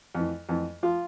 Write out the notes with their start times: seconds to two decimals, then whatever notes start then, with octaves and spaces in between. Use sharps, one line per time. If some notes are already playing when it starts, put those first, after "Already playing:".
0.15 F2 E3
0.49 F2 E3
0.83 F3 F4